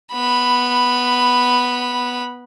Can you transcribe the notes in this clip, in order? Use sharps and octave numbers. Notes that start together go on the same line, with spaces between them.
B3 B5